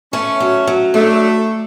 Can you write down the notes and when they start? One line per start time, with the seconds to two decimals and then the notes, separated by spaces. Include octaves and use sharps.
0.13 A3 C#4
0.40 F#3
0.67 F#3
0.94 A3 D4